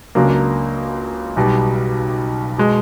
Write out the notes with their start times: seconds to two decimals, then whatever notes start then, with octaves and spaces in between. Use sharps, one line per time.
0.15 C#2 C#3 F#3 A#3 D4
1.36 B1 B2 G3
2.58 B2 G#3